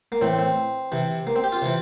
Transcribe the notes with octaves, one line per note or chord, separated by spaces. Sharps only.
A#3
A2 E3 C4
C4
C3 E3
A#3
C4
G4
F4
C3 E3